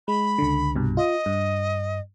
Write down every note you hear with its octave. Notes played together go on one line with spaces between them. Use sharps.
G#3 B5
C#2 D3
C2 G2 B2
F4 D#5
G2